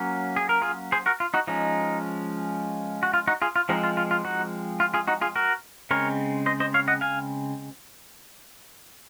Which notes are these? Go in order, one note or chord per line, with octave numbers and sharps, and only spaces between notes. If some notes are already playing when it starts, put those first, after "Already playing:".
Already playing: F#3 A#3 C#4
G#4
A#4
F4 G#4
G#4 C5
F#4 A#4
F4
D#4 F#4
F3 G#3 C#4 D#4
F#4
F4
D#4 F#4
F4 G#4
F4
F3 G#3 C4 D#4
F4
F4
F4
D#4 F#4
F4
F4 G#4
D#4 F#4
F4 G#4
F#4 A#4
C#3 G#3 C4 A#4 C#5
C5 D#5
C5 D#5
C#5 F5
D#5 F#5
F5 G#5